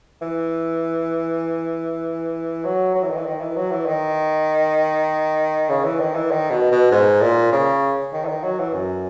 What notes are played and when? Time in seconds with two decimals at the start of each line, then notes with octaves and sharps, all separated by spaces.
0.22 E3
2.65 F#3
2.95 F#3
3.03 E3
3.10 D#3
3.18 E3
3.26 D#3
3.41 E3
3.56 F#3
3.71 E3
3.87 D#3
5.70 C#3
5.85 E3
6.00 D#3
6.15 E3
6.31 D#3
6.51 B2
6.71 B2
6.91 G#2
7.21 A#2
7.52 C#3
8.13 D#3
8.25 E3
8.28 D#3
8.44 F#3
8.59 E3
8.74 F#2